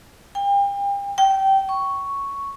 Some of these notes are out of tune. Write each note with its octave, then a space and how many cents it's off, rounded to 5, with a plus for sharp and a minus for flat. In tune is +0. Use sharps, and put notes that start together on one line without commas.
G5 +35
G5 -20
C#6 +0